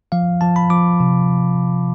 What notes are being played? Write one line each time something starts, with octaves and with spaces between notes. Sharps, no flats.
F3 F5
F3 A5
B5
F3 D6
C3